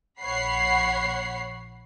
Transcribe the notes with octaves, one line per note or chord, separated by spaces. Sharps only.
A#1 C#5 F#5 B5 C7